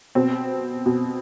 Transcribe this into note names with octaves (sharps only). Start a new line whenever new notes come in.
B2 C4
B2